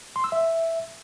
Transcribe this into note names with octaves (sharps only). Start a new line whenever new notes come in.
C6
E6
E5